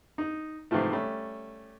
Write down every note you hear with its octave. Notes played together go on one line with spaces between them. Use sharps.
D#4
G#2 C3 E3 F3 A3
G3 A3 C#4